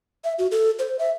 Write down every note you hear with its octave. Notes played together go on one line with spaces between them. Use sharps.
E5
F#4
A4
C5
E5